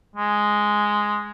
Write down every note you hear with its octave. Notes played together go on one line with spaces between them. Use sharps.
G#3